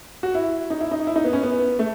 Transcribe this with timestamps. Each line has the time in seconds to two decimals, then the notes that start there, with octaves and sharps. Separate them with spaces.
0.23 F#4
0.35 E4
0.70 D#4
0.81 E4
0.91 D#4
1.07 E4
1.16 D#4
1.25 B3
1.33 C#4
1.43 B3
1.79 A3